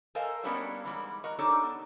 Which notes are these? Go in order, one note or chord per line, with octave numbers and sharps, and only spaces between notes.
A4 A#4 C5 D#5 F5 G#5
G3 A#3 B3 C#4 D4 F#4
G#2 E3 G3
F#4 A#4 D#5
D4 D#4 G4 A4 C#5
B3